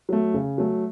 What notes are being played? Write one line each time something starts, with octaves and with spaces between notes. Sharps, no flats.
F#3 A3
C#3
F#3 A3